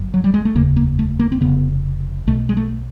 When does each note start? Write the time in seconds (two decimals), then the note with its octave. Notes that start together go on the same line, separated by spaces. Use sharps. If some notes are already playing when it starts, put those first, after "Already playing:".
Already playing: G1 F#2
0.14 F#3
0.24 G3
0.34 G#3
0.45 A3
0.55 F1 D#2 C#3 A#3
0.76 A#3
0.99 A3
1.19 A#3
1.32 C4
1.41 F1 D#2 C#3 B3
2.27 B1 B2 A3
2.49 G#3
2.57 A3